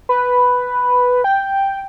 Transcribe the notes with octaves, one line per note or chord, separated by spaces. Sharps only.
B4
G5